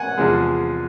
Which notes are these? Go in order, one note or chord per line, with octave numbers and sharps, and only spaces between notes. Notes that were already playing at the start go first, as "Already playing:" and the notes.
Already playing: F#5 G#5
E2 C3 F3 G#3